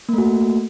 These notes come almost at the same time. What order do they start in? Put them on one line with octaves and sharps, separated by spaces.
A#3 A3 F#4